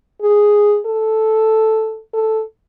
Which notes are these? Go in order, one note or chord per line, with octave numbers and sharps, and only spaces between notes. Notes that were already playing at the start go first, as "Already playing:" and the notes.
G#4
A4
A4